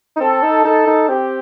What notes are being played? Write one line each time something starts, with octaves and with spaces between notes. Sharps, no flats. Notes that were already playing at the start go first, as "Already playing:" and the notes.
D#4
C4 A4
D#4
D#4 A4
D#4
C4 G4